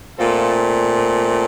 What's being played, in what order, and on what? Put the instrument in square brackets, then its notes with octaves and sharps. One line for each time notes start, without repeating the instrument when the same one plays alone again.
[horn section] A#2 A3 C4 F4 A4